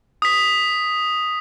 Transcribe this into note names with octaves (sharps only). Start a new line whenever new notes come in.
D#6 B6